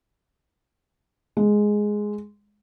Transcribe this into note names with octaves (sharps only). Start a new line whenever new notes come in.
G#3